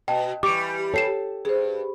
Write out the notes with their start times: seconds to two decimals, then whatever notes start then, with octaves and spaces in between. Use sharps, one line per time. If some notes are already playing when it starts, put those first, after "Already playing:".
0.08 B2 D#5 G5 A5
0.43 E3 G3 G4 C#6 D6 D7
0.94 G4 A4 C#5 C7 E7
1.45 G2 G#4 C5